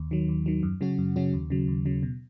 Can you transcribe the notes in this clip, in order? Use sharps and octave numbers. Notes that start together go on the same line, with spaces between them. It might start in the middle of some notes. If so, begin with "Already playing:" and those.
Already playing: D#2
D#3 F#3
D#2
D#3 F#3
F#2
C#3 F#3 C#4 F#4
F#2
C#3 F#3 C#4 F#4
D#2
C#3 F#3
D#2
C#3 F#3
B2